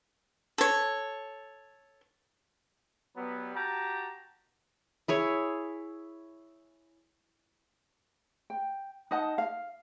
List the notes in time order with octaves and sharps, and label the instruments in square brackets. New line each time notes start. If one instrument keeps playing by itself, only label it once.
[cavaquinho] A4 C#5
[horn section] F#3 G3 B3
F#4 G4 A5 A#5
[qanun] E4 G#4 C#5
[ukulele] G5
D#4 D#5 F#5 A5
F5